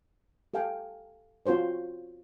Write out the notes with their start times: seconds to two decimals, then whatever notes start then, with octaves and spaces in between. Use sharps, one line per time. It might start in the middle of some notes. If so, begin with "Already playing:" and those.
0.54 G4 A4 F5 G5 G#5
1.46 C4 F4 F#4 C5 C#5